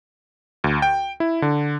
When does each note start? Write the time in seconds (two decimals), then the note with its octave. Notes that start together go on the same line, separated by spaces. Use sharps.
0.64 D2
0.82 G5
1.20 E4
1.42 D3